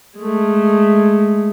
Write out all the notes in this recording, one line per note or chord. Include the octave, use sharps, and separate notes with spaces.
G#3 A3